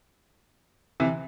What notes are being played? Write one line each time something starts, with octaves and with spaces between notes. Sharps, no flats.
C3 E3